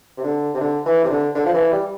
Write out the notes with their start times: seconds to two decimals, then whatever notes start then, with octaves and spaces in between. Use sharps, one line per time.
0.17 C3
0.23 D3
0.54 C3
0.61 D3
0.86 E3
1.03 C3
1.10 D3
1.35 D3
1.46 F3
1.54 E3
1.72 G3